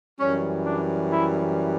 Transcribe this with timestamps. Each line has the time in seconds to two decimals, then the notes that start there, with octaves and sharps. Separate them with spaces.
0.20 F#2 E3 G3 C#4
0.66 D4
1.12 E4